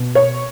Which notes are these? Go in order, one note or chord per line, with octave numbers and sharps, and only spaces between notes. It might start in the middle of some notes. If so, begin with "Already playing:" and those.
Already playing: B2
C#5